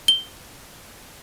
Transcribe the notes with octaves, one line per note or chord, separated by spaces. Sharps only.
G7